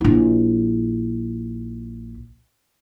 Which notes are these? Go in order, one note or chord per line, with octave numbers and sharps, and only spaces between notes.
A#1 E4